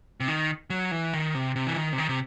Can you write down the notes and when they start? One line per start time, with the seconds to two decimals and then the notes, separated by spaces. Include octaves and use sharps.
0.20 C3
0.28 D#3
0.70 F#3
0.91 E3
1.14 D#3
1.35 C3
1.56 C3
1.67 E3
1.76 D#3
1.93 C3
1.98 D#3
2.09 C3